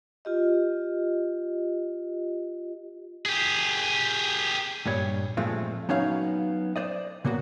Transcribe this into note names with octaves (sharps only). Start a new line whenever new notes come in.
F4 G4 D#5
G4 G#4
G2 A#2 G3 C#5
A#2 F3 G#3 A3 C4 F4
F#3 B3 C#4 D#4 C#5 F5
C5 D5 D#5
C#3 A#3 B3 F#4